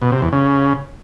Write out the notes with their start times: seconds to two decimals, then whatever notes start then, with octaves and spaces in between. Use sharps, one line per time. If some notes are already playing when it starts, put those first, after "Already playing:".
0.02 B2
0.12 C3
0.22 E2
0.32 C#3